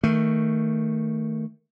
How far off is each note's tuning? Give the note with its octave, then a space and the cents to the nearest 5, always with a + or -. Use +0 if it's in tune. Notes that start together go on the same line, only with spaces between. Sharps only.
D#3 +20 A3 +15